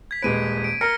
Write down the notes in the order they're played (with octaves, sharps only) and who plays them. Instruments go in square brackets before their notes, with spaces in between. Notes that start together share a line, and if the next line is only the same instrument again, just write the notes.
[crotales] G#6 B6
[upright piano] D#1 G#3 B4 [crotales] D7 D#7
[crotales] D7
[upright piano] A#4 [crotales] F6 A#6 C#7